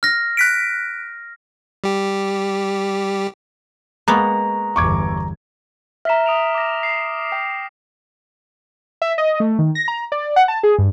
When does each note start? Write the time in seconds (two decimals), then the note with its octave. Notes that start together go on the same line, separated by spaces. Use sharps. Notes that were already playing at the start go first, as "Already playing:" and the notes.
0.03 F6 A#6
0.37 F#6 B6 D7
1.84 G3 G4
4.08 G#3 A#3 B3 A#5 C#6
4.76 G1 E2 C#6 D6 G#6
6.05 E5 A#5 F6 B6 E7
6.26 D#6 D7 F7
6.55 D6 A#6
6.83 C7
7.32 G5
9.02 E5
9.18 D#5
9.40 A3
9.59 D#3
9.75 A#6
9.88 A#5
10.12 D5
10.36 F#5
10.48 A5
10.63 G#4
10.79 G2